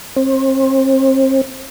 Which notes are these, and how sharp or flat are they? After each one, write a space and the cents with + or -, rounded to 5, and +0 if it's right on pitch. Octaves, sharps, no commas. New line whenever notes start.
C4 +35